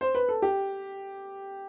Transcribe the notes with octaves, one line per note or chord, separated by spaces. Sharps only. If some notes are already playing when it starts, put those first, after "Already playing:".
C5
B4
A4
G4